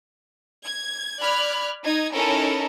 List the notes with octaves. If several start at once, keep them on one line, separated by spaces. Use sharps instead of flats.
G#6
D5 B5 F6 F#6 G#6
D#4 G#6
C#4 D#4 E4 A4 A#4